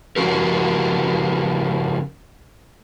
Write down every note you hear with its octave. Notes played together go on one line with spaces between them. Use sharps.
C#3 F3 C#4 F#4 G4 A#4